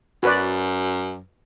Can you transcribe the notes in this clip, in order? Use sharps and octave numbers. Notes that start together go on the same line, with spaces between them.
F#2 F#4 B4 D5